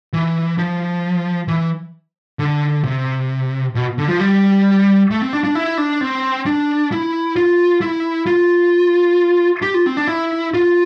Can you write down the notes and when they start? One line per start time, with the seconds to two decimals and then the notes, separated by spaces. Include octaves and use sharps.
0.13 E3
0.58 F3
1.48 E3
2.39 D3
2.84 C3
3.75 B2
3.98 D3
4.08 F3
4.19 G3
5.11 A3
5.22 C4
5.33 D4
5.44 D4
5.55 E4
5.78 D4
6.01 C4
6.46 D4
6.92 E4
7.36 F4
7.81 E4
8.27 F4
9.62 G4
9.74 F4
9.86 C4
9.97 D4
10.07 E4
10.54 F4